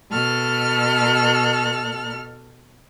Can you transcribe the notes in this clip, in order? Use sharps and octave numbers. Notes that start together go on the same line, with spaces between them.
B2 A4 F6